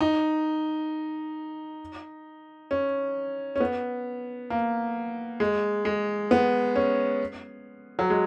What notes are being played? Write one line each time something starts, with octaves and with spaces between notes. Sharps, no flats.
D#4
C#4
C#4
B3
A#3
G#3
G#3
B3
C#4
F#3
G#3